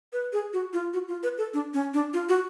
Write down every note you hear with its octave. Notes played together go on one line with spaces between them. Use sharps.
B4
G#4
F#4
F4
F#4
F4
B4
A4
D4
C#4
D4
F4
F#4